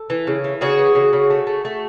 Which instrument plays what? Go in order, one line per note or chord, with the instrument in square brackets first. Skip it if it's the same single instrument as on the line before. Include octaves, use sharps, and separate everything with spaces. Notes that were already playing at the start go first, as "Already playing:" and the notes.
Already playing: [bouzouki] A4
E3
C#3
E3
C#3 F#4 G#4
E3
C#3
C#3
A3
A3
A3